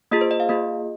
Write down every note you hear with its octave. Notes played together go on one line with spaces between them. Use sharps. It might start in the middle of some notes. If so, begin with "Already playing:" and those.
A#3 F4 G#4 D#5
C5
D#5
F5
A#3 F4 G#4 D#5